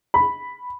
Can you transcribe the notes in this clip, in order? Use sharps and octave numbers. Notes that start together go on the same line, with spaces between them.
B5